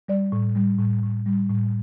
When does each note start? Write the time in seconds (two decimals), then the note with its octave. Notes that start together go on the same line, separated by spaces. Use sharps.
0.08 G3 D5
0.32 A2
0.56 G3
0.79 A2
1.03 A2
1.26 G3
1.49 A2